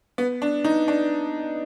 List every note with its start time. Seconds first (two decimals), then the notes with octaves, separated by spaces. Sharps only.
0.18 B3
0.42 D4
0.64 D#4
0.88 D4